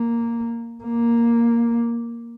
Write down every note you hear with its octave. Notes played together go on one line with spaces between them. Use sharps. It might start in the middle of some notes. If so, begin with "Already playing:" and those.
Already playing: A#3
A#3